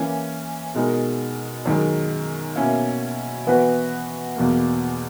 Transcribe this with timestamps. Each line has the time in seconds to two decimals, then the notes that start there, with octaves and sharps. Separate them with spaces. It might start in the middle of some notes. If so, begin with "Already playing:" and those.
Already playing: E3 A#3 C#4
0.75 B2 G#3 D#4 A#4
1.65 F#2 D#3 G#3
2.56 B2 A#3 C#4 E4
3.46 E3 B3 F#4 B4
4.36 E2 B2 A#3